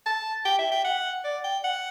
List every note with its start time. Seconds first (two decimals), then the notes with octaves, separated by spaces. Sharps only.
0.06 A5
0.45 G5
0.59 E5
0.71 G5
0.84 F#5
1.24 D5
1.44 G5
1.64 F#5